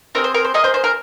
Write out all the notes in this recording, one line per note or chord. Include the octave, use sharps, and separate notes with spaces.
C4 D#4 G#4 A#4
C5
A#4
C5
A#3 G#4 D#5
C5
C5
A#4